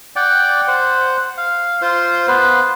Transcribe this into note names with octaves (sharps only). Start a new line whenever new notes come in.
D5 F#5 G5
C5 F#5
F5
F4 C5 C6
B3 B4 C5